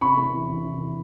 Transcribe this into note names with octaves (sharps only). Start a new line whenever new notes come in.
C3 B5 C#6
E2
E3
E3
C3
E3